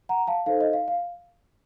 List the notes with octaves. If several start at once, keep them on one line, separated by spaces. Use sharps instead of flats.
F#5 A#5
F5 A5
D#4 A4 C5 F5
D#5
F5
F5